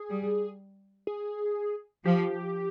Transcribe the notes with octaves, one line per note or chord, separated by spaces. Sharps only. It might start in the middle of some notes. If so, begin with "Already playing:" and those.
Already playing: G#4
G3
G#4
F3 G4